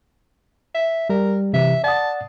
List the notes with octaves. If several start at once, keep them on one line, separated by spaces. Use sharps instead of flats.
E5
G3 A#4
C3 E3 E5
D5 F#5 A5 D#6